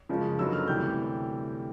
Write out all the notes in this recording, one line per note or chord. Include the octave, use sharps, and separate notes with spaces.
F#2 C#3 F3 G#3
F#2 D3 F#3 B3 D#4 E6
F6
D2 C3 E3 G3 G6